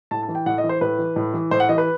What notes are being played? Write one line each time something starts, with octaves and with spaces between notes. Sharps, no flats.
A2 A5
A5
E3
G5
A2 F#5
D#5
E3
C5
A2 B4
E3
A2
E3
A2 C5
F#5
E3 D#5
B4